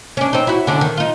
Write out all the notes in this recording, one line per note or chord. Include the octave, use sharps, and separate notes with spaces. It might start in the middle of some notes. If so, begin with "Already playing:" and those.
C#4 D4
C4 D#4
E4 F#4
D3 C#4 D4
D#3
D#4 F4